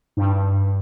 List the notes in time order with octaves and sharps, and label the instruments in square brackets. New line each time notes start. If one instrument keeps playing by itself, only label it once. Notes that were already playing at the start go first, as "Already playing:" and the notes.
[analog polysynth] G2